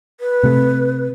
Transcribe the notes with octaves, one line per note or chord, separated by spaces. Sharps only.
B4
C3 A3